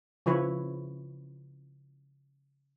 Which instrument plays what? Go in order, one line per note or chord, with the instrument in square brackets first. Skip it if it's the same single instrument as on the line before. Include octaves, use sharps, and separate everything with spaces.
[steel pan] C#3 F3 E4 B4 C#5